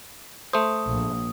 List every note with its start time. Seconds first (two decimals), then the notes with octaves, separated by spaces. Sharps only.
0.53 A3 C5 D#6
0.92 A#1